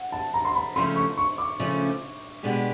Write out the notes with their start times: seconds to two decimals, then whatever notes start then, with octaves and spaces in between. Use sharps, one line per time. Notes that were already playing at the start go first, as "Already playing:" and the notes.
Already playing: F#5
0.12 A5
0.34 A#5
0.45 C6
0.54 B5
0.76 C#3 F3 A3 C#4 C6
0.96 C#6
1.17 C#6
1.38 D6
1.59 C#3 F3 A3 C#4
2.43 B2 G#3 B3 D4 G4